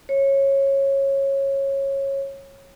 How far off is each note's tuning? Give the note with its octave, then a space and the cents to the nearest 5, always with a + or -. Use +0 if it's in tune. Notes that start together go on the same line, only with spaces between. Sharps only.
C#5 -15